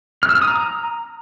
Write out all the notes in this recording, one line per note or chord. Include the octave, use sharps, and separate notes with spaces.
F6
E6
F6
D#6
A#5